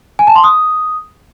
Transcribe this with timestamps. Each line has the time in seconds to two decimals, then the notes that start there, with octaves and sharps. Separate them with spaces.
0.19 G#5
0.27 A5
0.35 C6
0.44 D#6